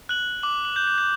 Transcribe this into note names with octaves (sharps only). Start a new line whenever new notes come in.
F#6 F#7
D6 F#7
F#7
G6
G6
G6